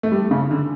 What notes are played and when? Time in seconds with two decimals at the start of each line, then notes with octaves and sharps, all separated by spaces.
0.03 A3
0.12 G3
0.31 C#3
0.51 D3